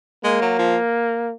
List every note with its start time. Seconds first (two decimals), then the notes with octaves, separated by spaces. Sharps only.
0.24 G#3 A#3
0.41 F#3
0.59 F3